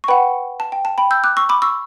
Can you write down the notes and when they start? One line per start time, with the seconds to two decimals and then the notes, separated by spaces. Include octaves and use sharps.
0.04 C#6
0.08 B4 F#5 G5 B5
0.60 A5
0.72 G5
0.85 A5
0.98 G5 B5
1.11 E6 G6
1.24 D6 F#6
1.37 C#6 E6
1.49 B5 D6
1.62 C#6 E6